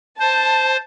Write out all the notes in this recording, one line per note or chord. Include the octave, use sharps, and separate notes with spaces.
C5 A5